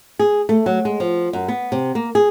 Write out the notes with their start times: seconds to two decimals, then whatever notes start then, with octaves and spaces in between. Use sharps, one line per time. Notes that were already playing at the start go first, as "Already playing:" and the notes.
0.19 G#4
0.49 A3
0.66 F#3
0.85 G#3
1.00 F3
1.33 F#2
1.48 B3
1.72 C3
1.95 A#3
2.15 G#4